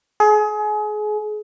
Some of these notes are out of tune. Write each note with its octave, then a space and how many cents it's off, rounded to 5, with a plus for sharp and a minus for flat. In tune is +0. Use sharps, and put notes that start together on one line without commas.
G#4 +30